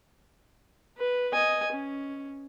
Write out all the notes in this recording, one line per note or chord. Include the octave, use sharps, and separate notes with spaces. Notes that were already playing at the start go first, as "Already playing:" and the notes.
B4
D#5 G#5
C#4